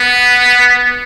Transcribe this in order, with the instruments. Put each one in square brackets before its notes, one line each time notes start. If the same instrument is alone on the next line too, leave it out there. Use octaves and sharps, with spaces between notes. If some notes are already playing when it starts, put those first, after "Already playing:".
Already playing: [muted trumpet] B3